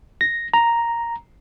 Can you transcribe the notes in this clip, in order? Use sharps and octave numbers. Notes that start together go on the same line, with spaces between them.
A#6
A#5